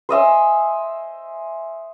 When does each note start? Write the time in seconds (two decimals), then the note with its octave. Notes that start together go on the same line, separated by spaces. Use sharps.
0.09 C5 D#5 E5 G#5